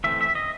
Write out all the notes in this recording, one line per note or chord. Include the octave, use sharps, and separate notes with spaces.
E3 A3 C4 E5
E5
D#5